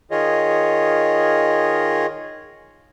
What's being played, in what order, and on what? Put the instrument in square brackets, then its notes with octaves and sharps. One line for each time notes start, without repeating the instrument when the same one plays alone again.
[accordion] D#3 F4 G#4 C#5 D#5